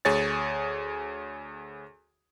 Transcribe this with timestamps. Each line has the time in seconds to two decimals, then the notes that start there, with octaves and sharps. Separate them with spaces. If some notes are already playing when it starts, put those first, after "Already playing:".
0.05 D2 G#4 C#5 A6